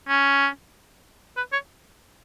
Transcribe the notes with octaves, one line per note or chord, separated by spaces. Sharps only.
C#4
B4
C#5